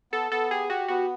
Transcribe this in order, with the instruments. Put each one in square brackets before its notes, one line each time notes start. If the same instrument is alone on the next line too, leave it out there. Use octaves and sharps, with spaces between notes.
[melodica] B3 [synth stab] A4
[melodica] B3 [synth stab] A4
[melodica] G4 [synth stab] G#4
[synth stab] F#4 [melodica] G4
[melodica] B3 [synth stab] F#4